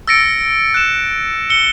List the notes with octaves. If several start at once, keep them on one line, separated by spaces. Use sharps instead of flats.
E6 A6 A#6 C#7 D7
F#6 E7
E6 C#7 G7